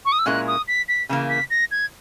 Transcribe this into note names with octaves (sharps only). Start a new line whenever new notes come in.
C#6
D#6
E6
A#2 G#3 C#4 E4 A#4 F#6
D#6
B6
B6
C#3 E3 A#3
B6
A#6
G#6